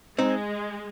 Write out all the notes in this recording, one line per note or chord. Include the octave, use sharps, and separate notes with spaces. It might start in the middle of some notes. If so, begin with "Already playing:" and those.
G#3 C4 D#4